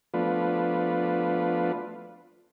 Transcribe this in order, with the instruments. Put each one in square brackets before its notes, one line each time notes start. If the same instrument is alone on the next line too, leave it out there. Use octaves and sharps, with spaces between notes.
[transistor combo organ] F3 A3 B3 D4 F4 B4